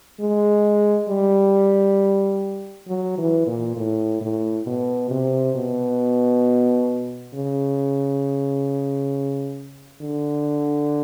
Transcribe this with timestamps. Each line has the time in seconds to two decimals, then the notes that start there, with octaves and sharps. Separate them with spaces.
0.21 G#3
1.09 G3
2.88 F#3
3.18 E3
3.47 A#2
3.77 A2
4.21 A2
4.67 B2
5.10 C3
5.56 B2
7.34 C#3
10.01 D3